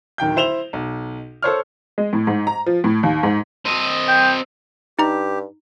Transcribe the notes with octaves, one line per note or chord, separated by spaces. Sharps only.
D1 D#3 G5 G6
E4 C5 E7 F7 G7
B1
A4 C5 C#5 F6
G#3
A2
G#2
A#5
F3
A2
D#2
G#2
C4 D#5
G5
G2 D#4 G4 A#5